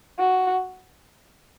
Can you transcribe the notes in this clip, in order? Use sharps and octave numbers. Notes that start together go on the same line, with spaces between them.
F#4